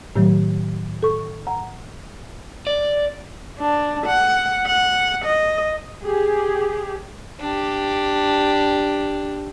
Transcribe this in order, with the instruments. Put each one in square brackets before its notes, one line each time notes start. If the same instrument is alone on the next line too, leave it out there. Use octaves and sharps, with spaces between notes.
[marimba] A2 D#3 F#3 A3
A4 C#6
F#5 A#5
[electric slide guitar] D5
[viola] D4
F#5
F#5
D#5
[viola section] G4 G#4
[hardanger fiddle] D4 G4